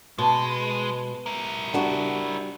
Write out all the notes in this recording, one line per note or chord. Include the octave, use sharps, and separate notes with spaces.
B2 G#3 A5
E4 A#4
G3 D4 F#4